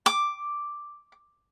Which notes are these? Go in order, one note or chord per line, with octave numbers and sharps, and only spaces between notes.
D6